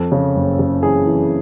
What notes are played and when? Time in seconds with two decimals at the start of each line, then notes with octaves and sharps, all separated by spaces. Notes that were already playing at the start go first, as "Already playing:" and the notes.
Already playing: F2 A4
0.12 C#3
0.36 F#1
0.59 C#3
0.83 E3 G#4
1.06 E3